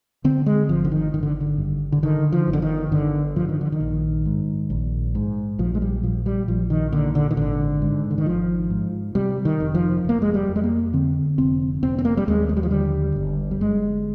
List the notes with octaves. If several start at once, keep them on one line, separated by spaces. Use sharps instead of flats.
D3 C4
G#3
G#1 F3
D3
D#3
G#1 D#3
D3
D3
G2
D3
D3 D#3
F3
G1
D3
D#3
G1 D3
G2 F3
D#3
D3
D#3
A#1
G#2
A#1
G#2
A#1 F3
G#3
G3
A#2 F3
G3
A#1 F3
D#3
A#2 D3
D3
D#3
G#1 D3
G#2
D3
D#3
G#1 F3
G#2
C3 G3
D#3
F1
F3
F1 A#3
G#3
G3
F2
G#3
A#3
D3 C4
F1 C4
F1 C4
C4
A#3
G3
D#2 G#3
G#3
G3
F3
D3 G3
G1
G3
G1 G#3